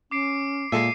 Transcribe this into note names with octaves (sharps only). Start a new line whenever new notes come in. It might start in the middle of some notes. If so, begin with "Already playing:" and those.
C#4 D6 C7 D7
A#2 G#3 A4 E5 C7 D#7